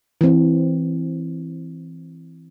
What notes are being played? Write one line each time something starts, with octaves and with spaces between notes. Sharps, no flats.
E3 C4